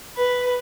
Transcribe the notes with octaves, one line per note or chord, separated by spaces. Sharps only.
B4